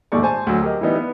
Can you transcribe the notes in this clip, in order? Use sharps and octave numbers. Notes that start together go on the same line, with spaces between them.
A#1 D#2 G#2 A3 D5 C#6
C5 G#5 A5
D2 F#3
G4 A#4 D#5
E3 G3 B3 D#4
B3